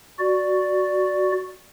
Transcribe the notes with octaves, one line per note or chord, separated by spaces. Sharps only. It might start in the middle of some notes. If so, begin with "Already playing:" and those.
F#4 D5